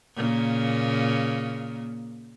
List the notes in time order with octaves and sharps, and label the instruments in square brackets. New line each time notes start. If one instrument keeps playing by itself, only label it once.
[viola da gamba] A#2 C#3 A#3